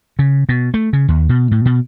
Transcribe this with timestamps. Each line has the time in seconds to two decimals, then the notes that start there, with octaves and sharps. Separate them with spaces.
0.19 C#3
0.49 B2
0.74 A3
0.93 C#3
1.08 D#2
1.29 B2
1.51 A2
1.65 B2